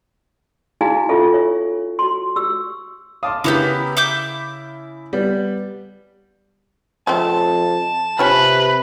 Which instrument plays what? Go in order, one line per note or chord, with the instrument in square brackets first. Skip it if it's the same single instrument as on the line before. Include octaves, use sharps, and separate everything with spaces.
[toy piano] D#4 E4 F#4 G#4 F5 G#5
C#4 F4 G4 A4 E5
C#5 E5
F#4 C6
G4 E6
[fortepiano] F5 A5 C6 [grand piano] D6 D#6
[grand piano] C#3 E4 F7 [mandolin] A#3 B3 G4
[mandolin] E5 D6 G6
[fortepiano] G3 B3
[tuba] F2 [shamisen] C#3 A3 C4 [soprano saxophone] A5
[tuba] C3 [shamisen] F4 C#5 G#5 [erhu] B4